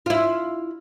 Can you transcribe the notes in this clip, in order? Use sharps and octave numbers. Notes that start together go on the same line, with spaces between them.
E4 F4